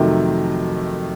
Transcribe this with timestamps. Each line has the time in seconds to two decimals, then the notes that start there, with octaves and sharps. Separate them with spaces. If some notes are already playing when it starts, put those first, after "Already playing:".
Already playing: F2 C3 D#3 F#3 A3